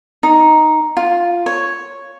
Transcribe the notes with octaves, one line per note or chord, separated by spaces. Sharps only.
D#4
F4
C#5